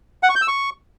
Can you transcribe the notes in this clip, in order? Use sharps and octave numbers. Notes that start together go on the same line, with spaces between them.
F#5
C#6
G6
E6
C#6